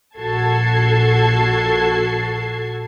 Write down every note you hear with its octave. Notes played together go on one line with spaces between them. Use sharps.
A#1 F#4 A4 A5 G#6 C7